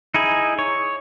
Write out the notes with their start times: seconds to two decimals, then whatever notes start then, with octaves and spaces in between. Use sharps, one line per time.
0.14 D#4 E4 G#4
0.59 C#5